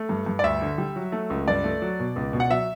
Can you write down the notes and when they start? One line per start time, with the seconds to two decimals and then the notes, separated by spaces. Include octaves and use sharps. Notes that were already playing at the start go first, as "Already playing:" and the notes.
Already playing: A3
0.09 G2
0.26 G2
0.39 D5
0.43 D2 E5
0.62 D3
0.78 G3
0.96 F#3
1.12 A3
1.30 C#2
1.48 G2 D5
1.64 A3
1.82 F#3
2.00 B2
2.16 C#2
2.33 B2
2.40 F#5
2.50 F#3 E5